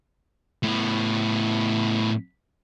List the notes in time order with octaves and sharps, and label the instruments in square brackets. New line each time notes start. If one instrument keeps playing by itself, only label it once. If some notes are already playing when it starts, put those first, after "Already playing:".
[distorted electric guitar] A2 B3